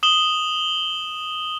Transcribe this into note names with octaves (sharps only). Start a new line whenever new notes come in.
D#6 E7 F#7 G7